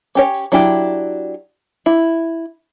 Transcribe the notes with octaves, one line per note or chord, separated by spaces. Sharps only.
C#4 G4 C#5
F#3 D4 E4 G4
E4